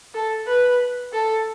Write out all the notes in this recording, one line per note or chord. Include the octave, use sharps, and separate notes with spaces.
A4
B4
A4